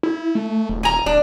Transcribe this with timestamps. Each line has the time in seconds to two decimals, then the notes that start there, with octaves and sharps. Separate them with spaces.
0.03 E4
0.35 A3
0.69 D#1
0.83 G#5 A#5
1.06 D1 D4